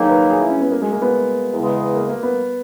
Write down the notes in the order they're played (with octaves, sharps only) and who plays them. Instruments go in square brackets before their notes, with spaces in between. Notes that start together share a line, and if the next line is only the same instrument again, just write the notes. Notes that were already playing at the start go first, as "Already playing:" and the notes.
Already playing: [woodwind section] D#3 F#3 A#3 D#4 [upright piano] G#4
[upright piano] B4
G#4
E4
C#4
B3
A#3
G#3
A#3
B3
[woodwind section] E2 C#3 G#3
[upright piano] A#3
A#3
B3